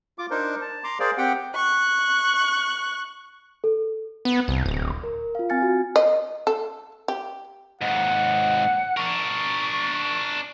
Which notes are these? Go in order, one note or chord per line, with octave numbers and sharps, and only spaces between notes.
F4 D6
D4 D#4 A#4 C5
A5
A#5 C6 D6
G#4 A#4 C5 D5 F5
C4 G4 F#5 G5
C#6 F#6
A4
B3
C2
D1
A#4
F4 F5
C4 G#5 F6 A6 C#7
F#4
D#5
A4
G4
D#2 G#2 F#5
D4 A#4 C#6